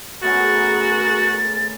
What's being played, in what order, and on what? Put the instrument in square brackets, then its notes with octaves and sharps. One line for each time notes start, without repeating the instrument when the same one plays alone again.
[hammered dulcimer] A3 B3 C#4 [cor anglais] F#4 [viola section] G#4 A#4 [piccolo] A6